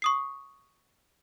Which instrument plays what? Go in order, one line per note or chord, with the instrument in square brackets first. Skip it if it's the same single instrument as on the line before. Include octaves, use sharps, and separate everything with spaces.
[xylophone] C#6 D#6 C7